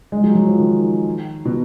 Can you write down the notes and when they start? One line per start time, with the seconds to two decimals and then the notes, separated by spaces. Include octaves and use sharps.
0.12 G#3
0.24 F#3
0.35 F#3
0.47 F3
0.59 D#3
1.45 B2